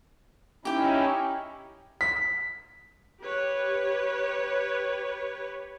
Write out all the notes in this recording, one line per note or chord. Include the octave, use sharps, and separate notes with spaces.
C#4 D#4 E4 G4 G5
B6
G4 B4 C#5